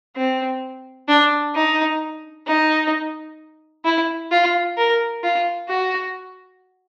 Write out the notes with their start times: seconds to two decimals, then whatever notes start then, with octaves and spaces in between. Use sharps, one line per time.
0.16 C4
1.08 D4
1.55 D#4
2.47 D#4
3.85 E4
4.31 F4
4.77 A#4
5.23 F4
5.69 F#4